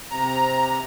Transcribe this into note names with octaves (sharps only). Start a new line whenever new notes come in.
C3 A#5